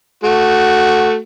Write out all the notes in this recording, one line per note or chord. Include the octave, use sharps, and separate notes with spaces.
A3 F#4